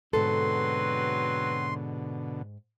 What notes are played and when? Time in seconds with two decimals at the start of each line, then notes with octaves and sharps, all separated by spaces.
0.13 G#2 B2 D3 F#3 C4 A4 B4 C6